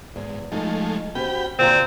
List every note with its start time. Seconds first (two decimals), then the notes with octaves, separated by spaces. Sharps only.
0.16 E2 G#2
0.52 F3 G#3 A3 D#4 A4
1.15 C#4 F#4 G4 C5 G5 B5
1.59 A#2 D3 C4 F4 G#4 A#5